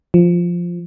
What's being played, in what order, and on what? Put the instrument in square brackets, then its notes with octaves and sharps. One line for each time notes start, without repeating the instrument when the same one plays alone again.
[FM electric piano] F3